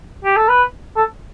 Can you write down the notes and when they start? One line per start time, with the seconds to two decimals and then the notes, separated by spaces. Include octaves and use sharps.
0.24 G4
0.36 A4
0.48 B4
0.96 A4